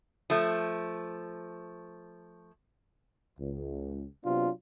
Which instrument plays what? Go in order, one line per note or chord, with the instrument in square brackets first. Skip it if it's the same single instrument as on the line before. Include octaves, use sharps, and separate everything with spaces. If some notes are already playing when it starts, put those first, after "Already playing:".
[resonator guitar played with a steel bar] F3 A3
[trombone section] C#2
C3 F#3 B3 D4 F4